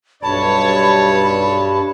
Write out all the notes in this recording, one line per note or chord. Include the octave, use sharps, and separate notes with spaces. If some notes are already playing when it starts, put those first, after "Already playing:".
B1 G2 C#5 A5 B5